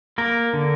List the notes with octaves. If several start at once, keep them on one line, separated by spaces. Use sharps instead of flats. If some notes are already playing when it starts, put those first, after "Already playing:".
A#3 A#4
D3